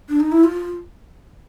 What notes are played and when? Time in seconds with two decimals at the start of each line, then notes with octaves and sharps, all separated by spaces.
0.09 D4
0.20 D#4
0.32 E4
0.44 F4